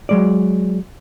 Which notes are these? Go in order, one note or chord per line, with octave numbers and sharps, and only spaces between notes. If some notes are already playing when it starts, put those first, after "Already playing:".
F#3 G#3 D5